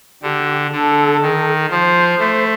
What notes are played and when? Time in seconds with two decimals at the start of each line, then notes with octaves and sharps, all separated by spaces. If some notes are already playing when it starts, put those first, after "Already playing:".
0.22 D3 G4
0.72 D3 A4
1.21 D#3
1.70 F3 C5
2.19 A3